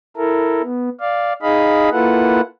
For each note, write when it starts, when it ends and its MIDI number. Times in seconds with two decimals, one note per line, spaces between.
0.17 0.62 64
0.17 0.62 69
0.17 0.62 70
0.62 0.90 59
1.00 1.33 74
1.00 1.33 77
1.42 1.89 63
1.42 1.89 68
1.42 1.89 75
1.42 1.89 77
1.42 1.89 83
1.92 2.41 58
1.92 2.41 64
1.92 2.41 65
1.92 2.41 69
1.92 2.41 71
1.92 2.41 78